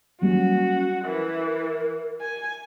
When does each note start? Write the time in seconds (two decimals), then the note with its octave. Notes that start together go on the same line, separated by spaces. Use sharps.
0.22 F#3 G3 A#3 C#4 F#4
1.05 E3 A#4
2.21 G#5